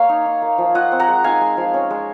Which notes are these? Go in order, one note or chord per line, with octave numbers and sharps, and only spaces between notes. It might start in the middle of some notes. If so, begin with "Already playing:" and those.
Already playing: A#3 C#5 F5
D#4
D#4
A#3
F3
F4 D#5 F#5
C4
F#5 A#5
G#3
D#4 F5 G#5
G#3
F3
C#4
G#3